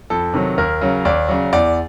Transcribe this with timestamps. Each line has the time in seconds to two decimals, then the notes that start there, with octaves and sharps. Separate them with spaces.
0.10 F2 A4
0.34 C3 D#3 F#3
0.58 D#2 A#4
0.81 C#3 F#3
1.05 D#2 D5
1.28 C#3 F#3
1.53 E2 D5